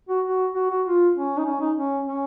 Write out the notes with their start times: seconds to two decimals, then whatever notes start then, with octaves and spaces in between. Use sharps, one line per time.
0.09 F#4
0.25 F#4
0.54 F#4
0.70 F#4
0.85 F4
1.15 C#4
1.38 D#4
1.46 C#4
1.60 D#4
1.76 C#4
2.07 C#4